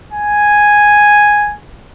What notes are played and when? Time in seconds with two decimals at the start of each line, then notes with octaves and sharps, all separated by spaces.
0.12 G#5